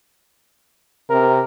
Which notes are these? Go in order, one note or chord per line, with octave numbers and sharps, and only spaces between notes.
C3 A#4